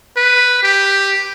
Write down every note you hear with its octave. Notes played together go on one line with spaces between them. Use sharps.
B4
G4